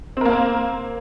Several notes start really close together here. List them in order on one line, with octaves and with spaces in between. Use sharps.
C4 A#4 A#3